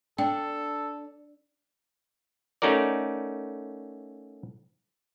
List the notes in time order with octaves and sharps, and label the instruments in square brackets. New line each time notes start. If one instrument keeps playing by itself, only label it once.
[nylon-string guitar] D4 [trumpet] A4 [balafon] G5
[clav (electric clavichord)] A3 C#4 D#4 F#4 A#4 D5